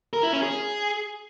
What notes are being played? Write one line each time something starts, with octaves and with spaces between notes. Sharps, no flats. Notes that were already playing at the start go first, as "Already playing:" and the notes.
A#4
E4
C#4
G#4